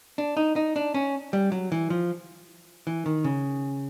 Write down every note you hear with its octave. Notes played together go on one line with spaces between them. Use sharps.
D4
D#4
D#4
D4
C#4
G3
F#3
E3
F3
E3
D#3
C#3